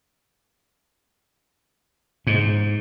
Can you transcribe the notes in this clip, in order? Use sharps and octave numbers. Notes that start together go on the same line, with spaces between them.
G#2